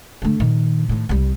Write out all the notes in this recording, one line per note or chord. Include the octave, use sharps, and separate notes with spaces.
D3 A3
A#2 D#3
A2 D#3
C2 G3